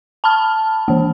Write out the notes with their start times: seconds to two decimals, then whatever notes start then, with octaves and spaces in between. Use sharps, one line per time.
0.24 A5 B5 F6
0.88 E3 A#3